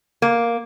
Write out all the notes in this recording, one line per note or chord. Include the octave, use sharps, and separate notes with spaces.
A#3